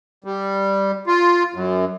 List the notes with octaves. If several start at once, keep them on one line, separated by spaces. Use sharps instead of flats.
G3
F4
F#2